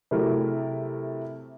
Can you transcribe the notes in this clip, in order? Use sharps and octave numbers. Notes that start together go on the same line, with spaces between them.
C3 F#3 A3 E4 G#4 A#4